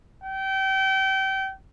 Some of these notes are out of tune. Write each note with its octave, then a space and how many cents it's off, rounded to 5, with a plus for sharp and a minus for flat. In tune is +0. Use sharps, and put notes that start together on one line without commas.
G5 -30